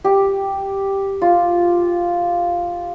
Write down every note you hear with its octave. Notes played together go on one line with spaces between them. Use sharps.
G4
F4